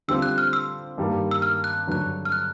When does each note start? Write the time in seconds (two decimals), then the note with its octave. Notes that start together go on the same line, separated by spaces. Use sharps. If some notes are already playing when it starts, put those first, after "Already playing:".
0.08 D3 G3 C4 F4 E6
0.22 F#6
0.38 F6
0.53 E6
0.98 G2 D#3 G3 A#3
1.31 E6
1.42 F6
1.64 F#6
1.87 G2 D3 F#3 F#6
2.25 F6
2.32 F#6